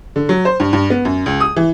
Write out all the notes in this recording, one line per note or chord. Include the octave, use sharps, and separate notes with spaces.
D3
F#3
C5
G2
G2
B3
F#2
C#2
D#6
E3